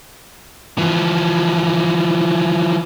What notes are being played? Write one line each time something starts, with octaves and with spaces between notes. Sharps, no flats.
E3 F3